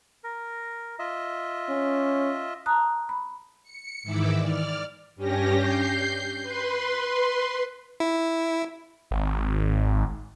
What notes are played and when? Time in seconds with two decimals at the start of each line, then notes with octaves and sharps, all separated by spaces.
0.24 A#4
0.99 F4 D#5 E5
1.69 C#4
2.66 A5 A#5 D#6 F#6
3.09 B5
3.63 C#7
4.03 G#2 D#3 E3 E4 D6 E6
4.39 D5 F6
5.16 G2 C#4 G4 A#6
5.55 G6 C7
6.42 B4 C6
8.00 E4
9.11 G#1